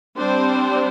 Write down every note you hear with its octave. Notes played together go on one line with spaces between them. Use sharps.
G3 C4 D4 C5